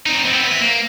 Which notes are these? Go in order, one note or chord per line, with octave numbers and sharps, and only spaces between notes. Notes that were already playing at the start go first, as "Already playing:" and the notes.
C4 D#4
B3 C4
E4 B4
A#3